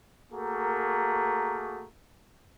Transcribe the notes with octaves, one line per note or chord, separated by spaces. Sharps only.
A3 A#3 F#4 G#4 A#4